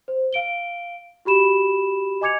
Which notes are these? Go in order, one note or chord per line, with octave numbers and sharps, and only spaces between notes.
C5
F5 D7 G7
F#4 G4 B5 E7
D#5 G#5 D6 G#6 C#7 F7